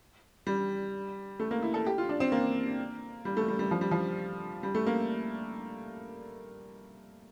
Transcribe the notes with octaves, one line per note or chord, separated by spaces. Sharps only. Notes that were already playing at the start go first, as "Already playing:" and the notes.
G3
A3
A#3
E4
A4
G4
F4
D4
C4
A#3
G3
A3
G3
G3
F3
G3
F3
G3
A3
A#3